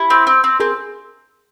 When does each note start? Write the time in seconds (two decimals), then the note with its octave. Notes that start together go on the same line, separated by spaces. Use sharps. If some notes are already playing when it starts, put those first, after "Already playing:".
Already playing: E4 G4
0.10 C4
0.27 C4
0.44 C4
0.60 C4 G#4 A#4